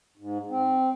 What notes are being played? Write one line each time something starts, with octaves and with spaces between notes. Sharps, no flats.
G#2
C4